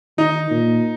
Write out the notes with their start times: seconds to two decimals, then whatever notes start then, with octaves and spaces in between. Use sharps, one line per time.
0.18 D#3 D#4
0.50 A#2